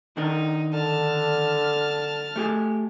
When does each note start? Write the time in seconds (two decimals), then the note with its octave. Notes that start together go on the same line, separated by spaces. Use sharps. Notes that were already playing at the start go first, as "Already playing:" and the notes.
0.17 D#3 D4 D#4 A#4
0.73 D3 A5 F6
2.36 A3 G4 G#4